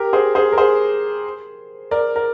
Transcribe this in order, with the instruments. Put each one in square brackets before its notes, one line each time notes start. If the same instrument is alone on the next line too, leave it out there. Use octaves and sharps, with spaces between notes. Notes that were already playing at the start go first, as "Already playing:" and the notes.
Already playing: [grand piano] G4 A#4
G#4 C5
G#4 C5
A#4
G#4 C5
A#4 D5
A#4